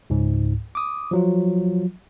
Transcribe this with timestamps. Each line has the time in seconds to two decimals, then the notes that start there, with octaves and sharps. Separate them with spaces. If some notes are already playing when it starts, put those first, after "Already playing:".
0.10 C#2 G#2
0.75 D6 D#6
1.11 F3 F#3 F4